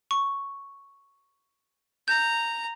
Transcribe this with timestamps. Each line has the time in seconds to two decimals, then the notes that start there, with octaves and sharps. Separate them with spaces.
0.11 C#6
2.08 A#5 G6